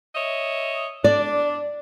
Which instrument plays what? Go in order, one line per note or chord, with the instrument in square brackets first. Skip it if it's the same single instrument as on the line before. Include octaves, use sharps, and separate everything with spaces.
[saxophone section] C#5 D#5 E5
[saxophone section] D4 [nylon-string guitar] D5